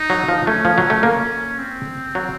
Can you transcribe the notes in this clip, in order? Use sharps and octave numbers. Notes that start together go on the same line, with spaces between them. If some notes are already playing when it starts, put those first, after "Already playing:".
Already playing: D#4
F#3
F3
A3 C#4
F3
F#3
A3
A#3
C4
F#3